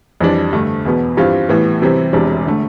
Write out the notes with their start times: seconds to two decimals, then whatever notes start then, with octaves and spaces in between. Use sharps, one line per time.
0.20 F2 E3 G3 D4
0.52 G2 D3 A3
0.85 E2 B2 B3
1.17 G2 E3 G3 C4 F4
1.49 A2 E3 G3 B3
1.82 C3 E3 G3 C4
2.13 E1 E2 C3 G3 D4
2.47 D3 A3